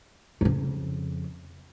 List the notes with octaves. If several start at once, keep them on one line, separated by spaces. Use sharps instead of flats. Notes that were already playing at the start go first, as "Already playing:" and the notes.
F2 C#3